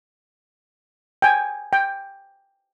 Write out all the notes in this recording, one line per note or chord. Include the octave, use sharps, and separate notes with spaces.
G5 G#5
G5